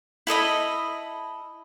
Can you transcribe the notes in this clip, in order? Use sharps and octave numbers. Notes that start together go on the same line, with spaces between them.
E4 A4 D#5 B5